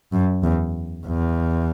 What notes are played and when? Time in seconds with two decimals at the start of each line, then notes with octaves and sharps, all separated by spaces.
0.12 F#2
0.43 E2
1.06 E2